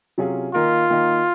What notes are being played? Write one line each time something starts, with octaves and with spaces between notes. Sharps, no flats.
C3 F#3 C#4 F4 G#4
D#3 A#3 D#4 F4 A#4
D#3 A#3 D#4 A#4